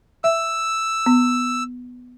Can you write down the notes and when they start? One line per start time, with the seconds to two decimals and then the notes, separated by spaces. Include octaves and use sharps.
0.24 E5 E6
1.06 B3